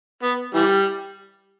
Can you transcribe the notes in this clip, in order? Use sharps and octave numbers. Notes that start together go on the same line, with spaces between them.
B3
E3 G3